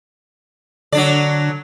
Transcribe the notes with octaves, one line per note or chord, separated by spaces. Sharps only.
D3 F#3 D4 D5